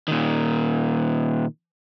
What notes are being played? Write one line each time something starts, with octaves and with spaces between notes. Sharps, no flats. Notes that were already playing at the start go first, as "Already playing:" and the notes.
A#2 D#3